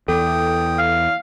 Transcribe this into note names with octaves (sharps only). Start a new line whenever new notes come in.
E2 A4 G5 D#6
F5